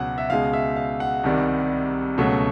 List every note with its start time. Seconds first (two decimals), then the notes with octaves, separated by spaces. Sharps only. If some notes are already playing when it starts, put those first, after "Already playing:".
Already playing: C#2 B2 F#3 F#5
0.18 E5
0.30 C#2 B2 G#3 F5
0.53 E5
0.76 F5
1.00 F#5
1.24 C2 C3 D#3 G3
2.18 C#2 B2 F#3 A3